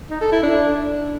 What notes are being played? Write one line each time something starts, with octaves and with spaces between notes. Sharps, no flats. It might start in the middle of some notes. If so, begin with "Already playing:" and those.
D#4
A4
E4
D4